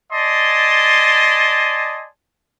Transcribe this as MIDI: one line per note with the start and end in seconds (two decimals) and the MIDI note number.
0.13 2.08 74
0.13 2.08 75
0.13 2.08 80
0.13 2.08 81
0.13 2.08 84